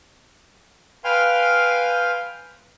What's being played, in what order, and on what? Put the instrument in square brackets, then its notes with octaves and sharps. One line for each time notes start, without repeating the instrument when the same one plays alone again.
[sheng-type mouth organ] B4 F5 G5 G#5 C6 F6